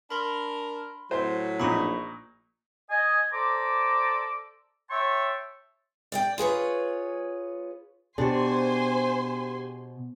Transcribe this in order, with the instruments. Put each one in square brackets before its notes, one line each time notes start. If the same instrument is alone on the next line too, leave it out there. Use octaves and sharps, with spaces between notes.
[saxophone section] D4 A#4 [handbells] B5 C6
[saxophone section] A2 F#3 [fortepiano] C5
[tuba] A#1 [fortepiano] A#2 D#4 [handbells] B5 C#6
[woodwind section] D#5 G#5
A4 C5 D5 A#5 D6
C#5 E5 G5 A5 C6 C#6
[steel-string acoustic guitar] D5 D#5 G5
F4 G#4 B4 C#5
[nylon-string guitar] B2 [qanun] D4 [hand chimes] G4 G#4 [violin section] C5 G#5 C6